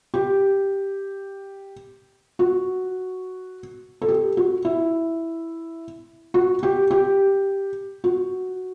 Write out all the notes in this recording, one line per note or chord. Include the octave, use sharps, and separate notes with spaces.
G4
F#4
A4
G4
F#4
E4
F#4
G4
G4
F#4